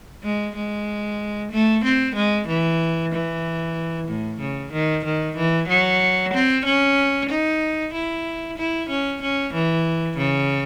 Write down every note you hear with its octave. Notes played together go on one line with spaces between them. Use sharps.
G#3
G#3
A3
C4
G#3
E3
E3
A2
C#3
D#3
D#3
E3
F#3
C4
C#4
D#4
E4
E4
C#4
C#4
E3
C#3